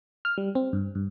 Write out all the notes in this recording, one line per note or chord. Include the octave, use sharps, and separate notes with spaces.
F6
G3
C4
G2
G2